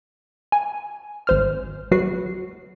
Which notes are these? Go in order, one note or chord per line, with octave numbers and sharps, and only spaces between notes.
G#5
G#1 C5 F6
F#3 F#4 B4 C7